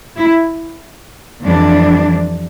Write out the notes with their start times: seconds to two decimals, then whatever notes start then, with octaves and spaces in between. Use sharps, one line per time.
0.18 E4
1.43 F2 E3 G3 D4